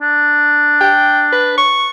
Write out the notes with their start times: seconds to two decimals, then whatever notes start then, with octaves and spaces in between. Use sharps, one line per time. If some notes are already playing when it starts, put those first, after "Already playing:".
0.01 D4
0.81 G5
1.33 B4
1.58 C#6